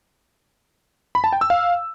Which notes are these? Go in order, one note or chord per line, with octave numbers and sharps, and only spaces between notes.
B5
A5
G5
E6
F5